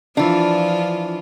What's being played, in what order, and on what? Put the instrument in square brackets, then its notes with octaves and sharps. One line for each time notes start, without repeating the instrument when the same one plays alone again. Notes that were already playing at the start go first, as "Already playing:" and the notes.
[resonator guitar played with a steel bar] E3 D4 [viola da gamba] F3 F4